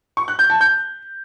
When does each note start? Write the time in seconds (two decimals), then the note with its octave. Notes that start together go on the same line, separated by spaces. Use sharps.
0.17 C#6
0.28 F#6
0.39 G6
0.50 A5
0.61 G6